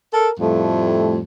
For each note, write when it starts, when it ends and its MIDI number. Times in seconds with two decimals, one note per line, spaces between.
0.14 0.29 69
0.14 0.29 70
0.39 1.19 41
0.39 1.19 45
0.39 1.19 55
0.39 1.19 57